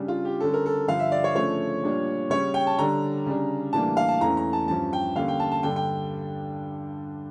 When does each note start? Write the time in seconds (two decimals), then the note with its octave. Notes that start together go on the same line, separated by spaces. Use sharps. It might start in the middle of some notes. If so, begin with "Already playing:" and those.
Already playing: C#3 G3 D4
0.08 F4
0.25 G4
0.40 D3 G3 C#4 A4
0.54 A#4
0.66 A4
0.88 G2 D3 F3 F5
0.99 E5
1.12 D5
1.24 C#5
1.36 C#3 F3 A3 D4 C#5
1.83 A#2 G3 A#3 D4
2.30 C#3 G3 C#4 C#5
2.54 G5
2.67 A5
2.79 D3 G3 D4 A#5
3.26 C#3 G3 D4
3.73 A2 E3 G3 A#3 D4 A5
3.97 F5
4.08 A5
4.20 E2 E3 A3 C#4 A#5
4.37 A#5
4.53 A5
4.68 G2 F3 C#4 A5
4.93 G5
5.16 D3 G3 A#3 C#4 F5
5.28 G5
5.40 A5
5.52 A5
5.63 G2 D3 G3 D4 G5
5.76 G5